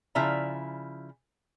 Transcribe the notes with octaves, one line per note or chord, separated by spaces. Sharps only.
C#3 F3 E4 D5 E5 A#5